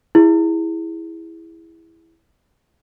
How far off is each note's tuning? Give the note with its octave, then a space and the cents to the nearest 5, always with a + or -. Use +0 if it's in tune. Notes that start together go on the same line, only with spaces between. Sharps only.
E4 +0 G#4 -20